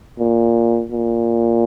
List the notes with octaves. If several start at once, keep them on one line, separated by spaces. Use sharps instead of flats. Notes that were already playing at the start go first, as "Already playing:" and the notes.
A#2
A#2